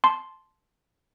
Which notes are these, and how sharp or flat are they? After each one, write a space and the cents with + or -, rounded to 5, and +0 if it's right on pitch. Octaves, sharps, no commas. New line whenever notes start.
A5 -10 C6 +0